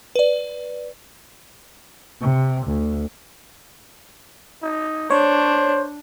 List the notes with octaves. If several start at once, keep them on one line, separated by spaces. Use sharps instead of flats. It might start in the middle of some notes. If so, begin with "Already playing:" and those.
B4 D5
C3
D2
D#4
D4 C5 C#5